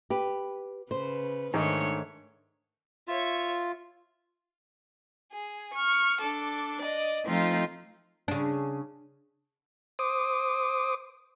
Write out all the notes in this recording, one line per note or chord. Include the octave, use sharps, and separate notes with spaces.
G4 B4
C#3 B4 C5
G#2 D#3 A3 D4 C#5
F4 C#5 E5
G#4
C#6 F6
D4 A4 D6
D5 D#5
F3 A3 C4 D#4 F4
C#3 D4
C5 D6 D#6